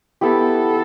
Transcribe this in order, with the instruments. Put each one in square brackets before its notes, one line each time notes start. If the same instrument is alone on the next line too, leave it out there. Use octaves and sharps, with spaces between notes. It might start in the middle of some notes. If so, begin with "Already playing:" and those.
[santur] B3 E4 G4 [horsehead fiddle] A4